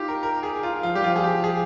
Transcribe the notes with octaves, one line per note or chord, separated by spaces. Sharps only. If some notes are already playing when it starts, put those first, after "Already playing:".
Already playing: D#4 F4 G4
A#4
A#4
G#4
F4
F3 F4
G3 G4
F3 F4
G#4
G4
G#4